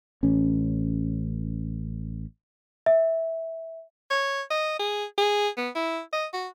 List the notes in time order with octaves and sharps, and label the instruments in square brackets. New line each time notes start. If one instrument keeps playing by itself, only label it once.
[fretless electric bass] A1 C#4
[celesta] E5
[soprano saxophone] C#5
D#5
G#4
G#4
B3
E4
D#5
F#4